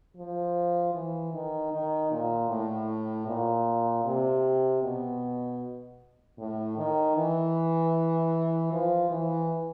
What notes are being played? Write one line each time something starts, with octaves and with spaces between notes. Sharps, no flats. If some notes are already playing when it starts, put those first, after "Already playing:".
F3
E3
D#3
D#3
A#2
A2
A#2
C3
B2
A2
D#3
E3
F3
E3